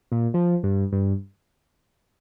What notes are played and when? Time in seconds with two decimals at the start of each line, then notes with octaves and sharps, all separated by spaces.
0.12 A#2
0.34 F3
0.63 G2
0.92 G2